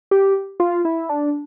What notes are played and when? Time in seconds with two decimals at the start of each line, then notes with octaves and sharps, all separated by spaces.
0.11 G4
0.60 F4
0.85 E4
1.09 D4